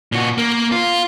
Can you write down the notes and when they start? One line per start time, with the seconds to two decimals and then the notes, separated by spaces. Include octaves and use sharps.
0.12 A#2 F#4
0.38 A#3
0.72 F4